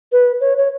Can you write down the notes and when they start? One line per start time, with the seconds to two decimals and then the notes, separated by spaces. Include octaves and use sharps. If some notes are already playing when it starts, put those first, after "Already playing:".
0.12 B4
0.41 C#5
0.57 C#5